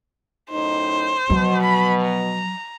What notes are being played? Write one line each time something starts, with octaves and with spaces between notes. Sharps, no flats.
F#2 A2 D#4 C5
B2 F3 F#3
B5
A#5